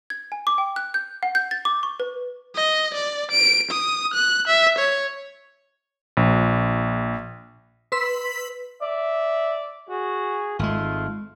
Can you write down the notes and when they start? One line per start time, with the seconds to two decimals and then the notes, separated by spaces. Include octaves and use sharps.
0.10 G#6
0.32 G#5
0.47 D6
0.58 G5
0.76 F#6
0.94 G6
1.23 F#5
1.35 G6
1.51 A6
1.65 D6
1.83 C#6
2.00 B4
2.55 D#5
2.94 D5
3.32 D7
3.71 D#6
4.14 F#6
4.48 E5
4.79 C#5
6.17 A#1
7.92 B4 C6 E6 B6
8.82 D5 E5
9.89 F#4 G#4
10.59 G#1 G#3 A3 F4